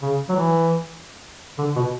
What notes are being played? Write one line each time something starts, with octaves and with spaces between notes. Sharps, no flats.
C#3
F#3
E3
D3
B2